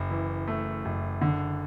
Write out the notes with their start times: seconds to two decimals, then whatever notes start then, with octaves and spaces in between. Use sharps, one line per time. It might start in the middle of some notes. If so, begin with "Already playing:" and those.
Already playing: F#1
0.10 E3
0.48 A3
0.85 F#1
1.21 D3